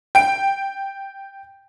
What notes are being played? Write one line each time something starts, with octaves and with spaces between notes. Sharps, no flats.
G5 D7